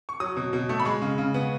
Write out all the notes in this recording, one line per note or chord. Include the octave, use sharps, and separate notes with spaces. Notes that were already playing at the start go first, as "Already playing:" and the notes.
C#6
F#3 D#6
B2
B2
A3
B5
G#3 C#6
C#3
C#3
B3